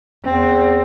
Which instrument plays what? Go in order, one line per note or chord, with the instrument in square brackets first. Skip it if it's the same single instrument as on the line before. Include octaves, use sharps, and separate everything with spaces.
[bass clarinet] E2 [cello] C4